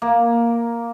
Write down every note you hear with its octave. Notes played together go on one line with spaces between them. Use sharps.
A#3